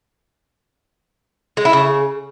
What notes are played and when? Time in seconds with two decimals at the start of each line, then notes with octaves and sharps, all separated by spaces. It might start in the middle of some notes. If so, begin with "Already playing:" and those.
1.57 G#3
1.65 E4
1.73 C#3